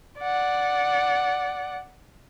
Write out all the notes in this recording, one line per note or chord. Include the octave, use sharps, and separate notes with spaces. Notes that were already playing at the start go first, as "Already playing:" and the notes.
D5 F#5